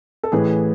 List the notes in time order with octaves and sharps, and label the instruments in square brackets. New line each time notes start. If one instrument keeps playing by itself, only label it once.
[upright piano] A4
A1 A2 E3 G#4 B4